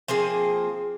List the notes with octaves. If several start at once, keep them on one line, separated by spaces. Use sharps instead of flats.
F3 A#3 C4 G#4